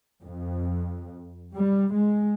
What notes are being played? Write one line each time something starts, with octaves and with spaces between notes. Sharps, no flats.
F2
G3
G#3